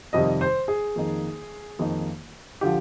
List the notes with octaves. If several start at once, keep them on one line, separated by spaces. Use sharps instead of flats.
F2 C3 D#3 G3 D#5
C5
G#4
F2 D#3 A#3 D#4
F2 D#3 A#3 D#4
D3 F3 G4